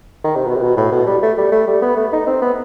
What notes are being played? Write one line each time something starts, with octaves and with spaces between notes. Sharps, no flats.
D#3
C3
B2
C3
B2
A2
B2
G3
A3
G3
A3
G3
B3
A3
D#4
C4
B3